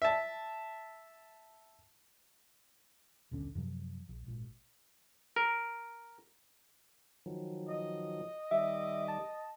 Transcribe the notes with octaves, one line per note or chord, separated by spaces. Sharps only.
E5 A5
D#1 B1 D3 C#4
F#2 C3 F3 F#3
A#1
G#1 A#2
A#4
D#3 F3 F#3
D#5
D#3 G3 E5 D6
A5